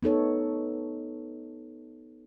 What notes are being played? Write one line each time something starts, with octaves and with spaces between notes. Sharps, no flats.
B3 D#4 A4 C#5